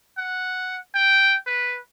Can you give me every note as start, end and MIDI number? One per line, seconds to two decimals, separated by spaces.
0.18 0.77 78
0.95 1.36 79
1.47 1.79 71